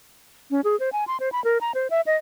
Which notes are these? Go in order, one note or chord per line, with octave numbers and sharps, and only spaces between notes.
C#4
G#4
C5
G#5
C6
C5
B5
A#4
A#5
C5
E5
D#5